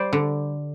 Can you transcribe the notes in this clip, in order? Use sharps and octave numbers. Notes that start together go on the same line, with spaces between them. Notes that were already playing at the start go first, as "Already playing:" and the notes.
Already playing: G3 C5 D5
D3